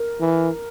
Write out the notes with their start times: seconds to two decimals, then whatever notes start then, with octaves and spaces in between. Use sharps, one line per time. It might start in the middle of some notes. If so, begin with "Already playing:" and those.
Already playing: A#4
0.20 E3